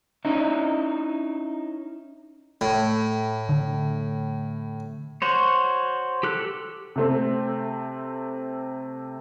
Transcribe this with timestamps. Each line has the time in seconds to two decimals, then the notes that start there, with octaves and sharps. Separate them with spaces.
0.25 C#4 D#4 E4
2.61 A2
3.49 D3
5.22 F#4 C5 C#5
6.23 G4 A4 F#6
6.96 C3 A3 C4